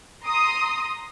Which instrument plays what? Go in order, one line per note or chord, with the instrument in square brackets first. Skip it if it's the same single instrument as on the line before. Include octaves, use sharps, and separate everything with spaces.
[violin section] A#5 C6 D#6